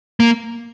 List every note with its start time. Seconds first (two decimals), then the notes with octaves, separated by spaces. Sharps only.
0.20 A#3